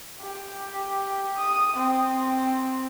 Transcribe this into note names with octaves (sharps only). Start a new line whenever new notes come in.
G4
D#6
C4